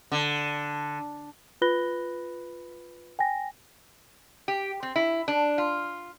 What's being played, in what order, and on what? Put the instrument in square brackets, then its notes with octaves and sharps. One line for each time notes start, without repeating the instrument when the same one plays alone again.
[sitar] D3
[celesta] F4 B4 B5 F#6 A#6 G7
G5 G#5 A#6
[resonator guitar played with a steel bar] G4
C4
E4
D4
F4